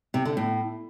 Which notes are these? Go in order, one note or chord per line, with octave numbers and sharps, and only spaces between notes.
C3
D3
A2